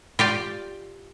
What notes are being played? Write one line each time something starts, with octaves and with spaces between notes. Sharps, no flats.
F4 G4 D5